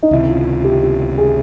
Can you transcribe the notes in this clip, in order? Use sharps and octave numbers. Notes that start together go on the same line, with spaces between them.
D#4
C#2 C3 D#3 E4
F4
G4
G4
G#4